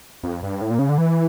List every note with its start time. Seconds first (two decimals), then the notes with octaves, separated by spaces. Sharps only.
0.23 F2
0.43 G2
0.61 A2
0.71 A#2
0.79 C#3
0.89 D3
0.98 E3